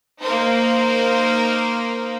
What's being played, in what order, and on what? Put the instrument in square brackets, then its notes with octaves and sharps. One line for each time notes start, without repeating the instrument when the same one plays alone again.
[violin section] A#3 D#4 A#4 C5